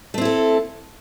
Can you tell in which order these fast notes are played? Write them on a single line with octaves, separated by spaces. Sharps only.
A3 C4 E4 A4